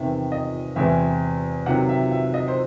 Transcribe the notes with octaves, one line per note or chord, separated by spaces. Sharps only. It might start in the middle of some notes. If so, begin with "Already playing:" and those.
Already playing: E2 C3 D#3 E5
D#5
E2 C3 E3 G#3 E5
C3 D#3 F#3 F#5
E5
E5
D#5
C5